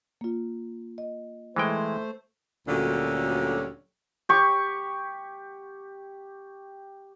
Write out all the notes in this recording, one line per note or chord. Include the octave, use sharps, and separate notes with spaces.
A#3 F4
D#5
E3 G#3 A3 C5 G5
D2 A#2 D3 F#3 G3 C#4
G4 C#6